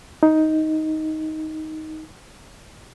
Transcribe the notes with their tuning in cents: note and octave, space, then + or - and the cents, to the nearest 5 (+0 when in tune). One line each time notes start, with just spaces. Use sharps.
D#4 +10